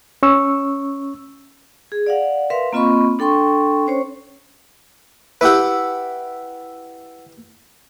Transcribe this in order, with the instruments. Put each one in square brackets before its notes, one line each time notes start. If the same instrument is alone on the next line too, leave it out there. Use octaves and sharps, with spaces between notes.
[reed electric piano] C#4 C#6 E6
[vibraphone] G#4
D5 F5 F#5
A#4 B4 E5 F5 C6
A#3 C4 F4 D#5 B5 C#6
D4 A4 G5 C6 C#6
C#4 C5 C#5
[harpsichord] E4 G4 A4 [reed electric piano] B4 F#5